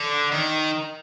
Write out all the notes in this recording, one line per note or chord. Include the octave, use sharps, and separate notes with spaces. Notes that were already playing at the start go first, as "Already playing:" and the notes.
Already playing: D3
D#3